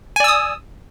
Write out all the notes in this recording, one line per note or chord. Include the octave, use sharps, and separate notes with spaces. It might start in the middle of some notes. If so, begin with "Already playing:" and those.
D5 G#5 D#6 E6